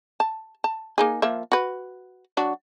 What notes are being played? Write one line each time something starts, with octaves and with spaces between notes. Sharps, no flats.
A5
A5
A#3 D#4 G#4
F3 A#3 E5
F#4 B4
F#3 D4 F#4